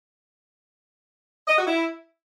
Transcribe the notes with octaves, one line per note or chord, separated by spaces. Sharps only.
D#5
F#4
E4